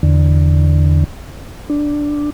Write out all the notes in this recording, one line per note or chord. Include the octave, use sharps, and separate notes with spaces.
E2 D3
D4